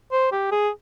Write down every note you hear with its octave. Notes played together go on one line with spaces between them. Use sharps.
C5
G4
G#4